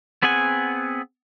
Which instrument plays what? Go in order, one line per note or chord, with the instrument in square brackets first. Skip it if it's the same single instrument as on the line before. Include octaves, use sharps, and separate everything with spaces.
[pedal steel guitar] B3 C4 G#4 F#5 G#5